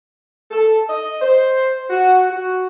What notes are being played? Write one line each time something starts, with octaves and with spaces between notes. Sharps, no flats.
A4
D#5
C5
F#4
F#4